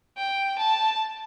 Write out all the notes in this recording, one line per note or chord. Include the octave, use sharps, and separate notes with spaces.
G5
A5